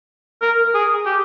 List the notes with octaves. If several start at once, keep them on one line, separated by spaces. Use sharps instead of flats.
A#4
G#4
G4